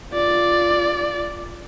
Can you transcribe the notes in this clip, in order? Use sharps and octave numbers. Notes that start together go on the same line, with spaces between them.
F4 D5